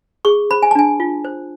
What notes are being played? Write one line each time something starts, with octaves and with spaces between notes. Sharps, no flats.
G#4 C#6
C5 B5
G#5
A5
D4 G#5
F4
C5